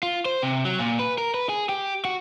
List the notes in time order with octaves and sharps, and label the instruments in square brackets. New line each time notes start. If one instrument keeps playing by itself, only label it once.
[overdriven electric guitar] F4
C5
C3
F#3
A#2
B4
A#4
B4
G#4
G4
F#4